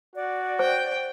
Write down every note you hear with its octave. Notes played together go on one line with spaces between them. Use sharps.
F#4 D5
C5 G5